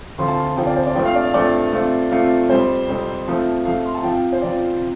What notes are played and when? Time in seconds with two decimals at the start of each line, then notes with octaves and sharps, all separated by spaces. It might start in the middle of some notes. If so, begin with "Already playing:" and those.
0.18 D2 C3 F3 C4 F4 C6
0.28 A5
0.37 C6
0.56 D2 C3 F3 C4 F4 G5
0.66 D5
0.76 C5
0.86 D5
0.95 G2 F3 A3 C4 G5
1.05 F5
1.15 D5
1.25 F5
1.34 G2 F3 A3 C4 D5
1.72 C3 A3 C4 F4
2.10 C3 A3 C4 F4
2.49 F2 C3 G3 C4 C5
2.88 F2 C3 G3 C4
3.26 C3 F3 A3
3.65 C3 F3 A3 F5
3.85 C6
3.95 A5
4.03 C3 F3 C4 F4 G5
4.32 C5
4.42 C3 F3 C4 F4 D5
4.80 C3